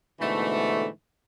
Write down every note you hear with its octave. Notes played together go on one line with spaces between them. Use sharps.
G#2 B2 D3 E3 A3